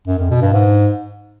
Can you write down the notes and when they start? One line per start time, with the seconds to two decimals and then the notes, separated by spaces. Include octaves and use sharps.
0.07 F#2
0.19 F2
0.30 B2
0.42 G2
0.53 G#2